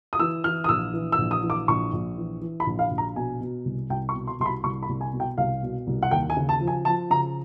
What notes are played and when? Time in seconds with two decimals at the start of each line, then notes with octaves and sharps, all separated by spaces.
0.13 D#6
0.19 E3 E6
0.44 E3 F6
0.64 D#6
0.69 A#1 E6
0.94 E3
1.12 E6
1.18 A#1
1.31 D#6
1.43 E3
1.50 D6
1.68 A#1 C#6
1.93 A#1
2.17 E3
2.41 E3
2.60 B5
2.67 A#1
2.79 F5
2.91 A#1
2.98 A#5
3.16 B2 G#5
3.41 B2
3.65 C2
3.90 C2 G5
4.09 C#6
4.14 B2
4.27 C6
4.40 C2 C6
4.46 B5
4.64 C2 C#6
4.83 B5
4.89 C2
5.01 G#5
5.13 B2
5.20 G5
5.38 C2 F5
5.63 B2
5.87 C2
6.03 F#5
6.11 D#2 G5
6.30 G#5
6.37 C#3
6.49 A5
6.60 F3
6.67 G#5
6.85 F3 A5
7.10 C#3 A#5